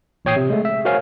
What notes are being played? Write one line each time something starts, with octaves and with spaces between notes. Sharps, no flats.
A1 A#2 C#5 G5 D#6 C7
C3
G#3 A3
E5
F#4 A#4 C5 C#5 F5 G#5